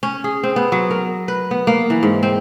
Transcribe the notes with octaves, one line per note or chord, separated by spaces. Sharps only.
C#4
G#4
C4
B3
F#3
A#4
B4
B3
A#3
E3
G#2
C4